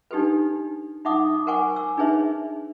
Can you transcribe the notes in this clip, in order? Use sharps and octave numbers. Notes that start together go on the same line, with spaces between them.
D4 D#4 G4 A4 B4
D#4 E5 F#5 D6 D#6
A#4 C5 F#5 G#5 C#6 D6
E6
D4 D#4 G#4 B4 C#5 E5